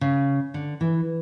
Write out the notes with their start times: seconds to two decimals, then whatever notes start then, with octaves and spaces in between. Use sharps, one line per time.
0.01 C#3
0.54 D3
0.81 E3